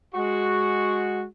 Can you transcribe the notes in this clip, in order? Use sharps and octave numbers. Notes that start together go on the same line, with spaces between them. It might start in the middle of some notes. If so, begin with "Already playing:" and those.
G#3 F#4